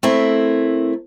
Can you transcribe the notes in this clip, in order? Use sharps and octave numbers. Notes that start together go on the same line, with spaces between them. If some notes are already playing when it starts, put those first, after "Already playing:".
A3 C4 E4 A#4